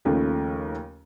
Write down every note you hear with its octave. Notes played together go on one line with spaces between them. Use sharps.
D#2 C#3 F3 A3